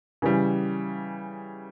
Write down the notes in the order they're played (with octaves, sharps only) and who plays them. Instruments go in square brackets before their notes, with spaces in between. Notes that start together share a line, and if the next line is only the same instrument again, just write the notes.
[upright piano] C#3 E3 G3